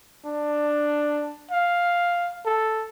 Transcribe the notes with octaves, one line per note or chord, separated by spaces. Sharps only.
D4
F5
A4